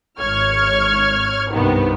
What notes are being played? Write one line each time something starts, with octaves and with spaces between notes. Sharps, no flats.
G#1 C#5 F6 G#6 C#7
C2 G2 C3 D#3 B3